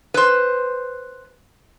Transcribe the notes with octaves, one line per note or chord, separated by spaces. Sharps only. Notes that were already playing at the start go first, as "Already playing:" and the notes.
B4 C5